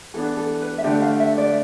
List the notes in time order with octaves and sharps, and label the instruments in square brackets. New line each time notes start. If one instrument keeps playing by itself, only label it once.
[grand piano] E3 B3 D4 [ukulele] A4
[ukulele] A4
B4
E5
[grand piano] D3 A3 D4 G4 [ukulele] D5
[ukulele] F5
E5
D5